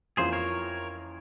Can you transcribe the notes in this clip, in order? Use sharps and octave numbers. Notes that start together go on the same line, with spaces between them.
F2 E3 A#3 C#4 F4 G#4 C5
A#4 C#5